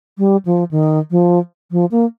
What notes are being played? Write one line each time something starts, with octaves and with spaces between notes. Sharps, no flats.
G3
F3
D#3
F3
F3
A#3